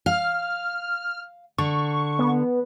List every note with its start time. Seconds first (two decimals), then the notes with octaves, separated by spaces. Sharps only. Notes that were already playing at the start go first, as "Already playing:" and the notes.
0.06 F5 F6
1.58 D3 C#6
2.19 B3